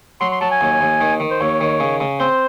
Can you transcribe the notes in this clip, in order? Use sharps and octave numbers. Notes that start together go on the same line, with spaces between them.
F#3 C6
C6
F#3 A5
G#5
D#2
D#2
D#3
D#3
C5
D#2 C#5
D#3
C#3
C#3
C4 C5